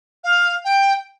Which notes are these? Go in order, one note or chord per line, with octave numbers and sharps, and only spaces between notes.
F5
G5